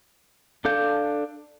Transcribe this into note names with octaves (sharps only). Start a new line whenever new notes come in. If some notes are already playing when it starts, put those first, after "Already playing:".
D4 A4 F5 G6